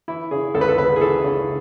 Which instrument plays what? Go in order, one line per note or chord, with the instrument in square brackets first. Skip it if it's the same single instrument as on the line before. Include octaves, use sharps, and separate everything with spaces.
[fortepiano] E3 E4
C#3 G#4
C#2 A4
B4
A4
C#2 B4
G#4
E3 A4
C#3